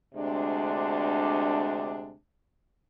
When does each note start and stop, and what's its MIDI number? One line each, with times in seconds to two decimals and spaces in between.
0.15 2.13 38
0.15 2.13 48
0.15 2.13 56
0.15 2.13 62